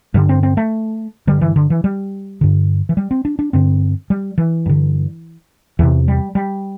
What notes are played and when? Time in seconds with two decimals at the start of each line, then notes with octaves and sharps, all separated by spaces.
0.14 G2 D3 G3
0.29 C4
0.43 C4
0.57 A3
1.27 G2 D3 G3
1.41 E3
1.56 D3
1.70 E3
1.84 G3
2.41 G2 D3
2.89 E3
2.97 G3
3.11 C4
3.25 D4
3.39 D4
3.53 G2 D3 C4
4.10 G3
4.38 E3
4.66 G2 D3
5.79 E2 C3 E3
6.08 G3
6.35 G3